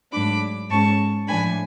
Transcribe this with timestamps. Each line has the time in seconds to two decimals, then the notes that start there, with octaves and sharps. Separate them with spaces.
0.12 G#2 F#3 A3 D4 B5 D6
0.70 G#2 G#3 C#4 A5 C#6
1.28 A2 F3 A3 D4 G#5 B5